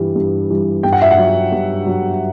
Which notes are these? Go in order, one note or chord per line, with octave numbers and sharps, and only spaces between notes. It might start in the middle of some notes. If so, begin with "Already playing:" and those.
Already playing: G2 E3 G3
G2
E3 G3
G2 G5
F#5
E5
F#5
F#3
G2
F#3